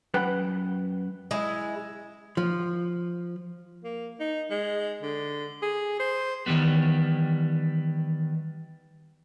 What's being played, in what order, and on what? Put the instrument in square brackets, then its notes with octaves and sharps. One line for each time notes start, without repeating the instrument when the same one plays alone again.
[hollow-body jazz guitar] F#2 B4 F#5 G5
[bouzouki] G#3 E4
[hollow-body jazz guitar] F3
[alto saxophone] A#3
D#4
G#3
D3
G#4
C5
[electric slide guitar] D#3 E3 G3 B3